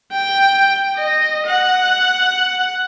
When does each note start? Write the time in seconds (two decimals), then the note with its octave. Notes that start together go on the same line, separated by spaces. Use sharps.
0.12 G5
0.97 D#5
1.46 F#5